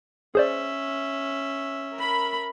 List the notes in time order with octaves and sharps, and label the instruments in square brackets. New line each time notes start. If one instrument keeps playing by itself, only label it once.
[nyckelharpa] C#4 E5 [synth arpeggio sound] G#4 C5 D5
[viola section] A#4 B5